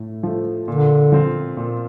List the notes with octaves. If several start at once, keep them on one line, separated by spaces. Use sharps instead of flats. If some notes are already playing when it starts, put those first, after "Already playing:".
Already playing: A2 A3
F3 A3
A#2 D3
F3 C4 F4
A#2